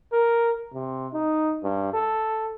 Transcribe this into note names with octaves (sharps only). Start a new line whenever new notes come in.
A#4
C3
D#4
G2
A4